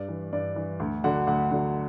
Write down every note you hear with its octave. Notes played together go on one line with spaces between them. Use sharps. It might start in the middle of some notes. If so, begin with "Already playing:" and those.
Already playing: G2 D5
E3
G2 D5
E3
D2
D3 F#3 F#5
D2 F#5
D3 F#3